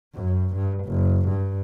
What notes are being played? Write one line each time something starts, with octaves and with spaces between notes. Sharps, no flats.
F#2
G2
F#1
G2